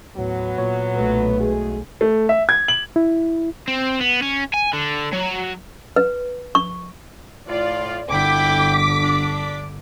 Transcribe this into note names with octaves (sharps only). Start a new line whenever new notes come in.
D#2 A2 F#3 B3
A#2 C#5
B1 A3 B4
G#3 F#4 G#4
A3
E5
G#6
F#7
E4
C4
B3
C#4
G#5
D3
F#3
B4
C#6
A2 F4 D5
G1 D3 E4 F#5 G5 D6 B6
D4